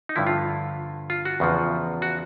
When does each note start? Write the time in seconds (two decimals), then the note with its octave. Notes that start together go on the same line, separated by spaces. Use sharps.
0.09 D#4
0.16 G2 D3 F3 E4
0.27 F4
1.10 F4
1.25 F#4
1.40 E2 C#3 F3
2.02 F#4